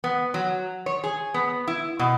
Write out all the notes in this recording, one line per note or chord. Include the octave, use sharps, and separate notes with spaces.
B3
F#3
C#5
G#4
B3
E4
B2